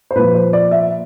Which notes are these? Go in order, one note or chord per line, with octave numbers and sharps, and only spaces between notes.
C5
A#2 F3 B4
C5
D5
E5